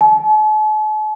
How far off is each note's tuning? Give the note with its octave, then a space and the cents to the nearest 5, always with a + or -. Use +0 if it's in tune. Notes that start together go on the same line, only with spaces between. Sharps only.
A5 -45